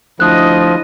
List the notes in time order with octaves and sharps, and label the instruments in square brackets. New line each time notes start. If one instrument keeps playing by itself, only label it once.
[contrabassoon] D2 [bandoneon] F3 [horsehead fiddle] E4 D#5 [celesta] D#6 F#6